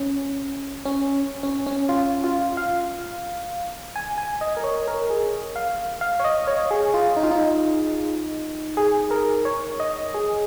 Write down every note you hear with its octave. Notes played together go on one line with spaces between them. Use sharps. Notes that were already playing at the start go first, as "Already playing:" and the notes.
Already playing: C#4
C#4
C#4
C#4
F4
F4
F5
G#5
G#5
D#5
A#4
C#5
A#4
G#4
F5
F5
C#5
D#5
C#5
G#4
F4
D#4
F4
D#4
G#4
A#4
C#5
D#5
G#4